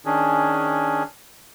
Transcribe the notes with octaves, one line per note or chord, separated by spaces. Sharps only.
D#3 C#4 D4 G#4